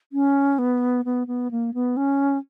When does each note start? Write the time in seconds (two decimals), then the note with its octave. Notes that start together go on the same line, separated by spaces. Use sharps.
0.13 C#4
0.59 B3
1.05 B3
1.27 B3
1.51 A#3
1.74 B3
1.97 C#4